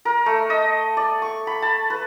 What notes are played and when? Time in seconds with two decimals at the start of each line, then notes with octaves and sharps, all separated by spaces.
0.05 A#4
0.26 A3
0.50 D#5
0.97 D5
1.22 C#6
1.47 B5
1.62 A5
1.90 B4